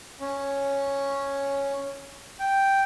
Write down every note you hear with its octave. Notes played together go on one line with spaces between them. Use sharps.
C#4
G5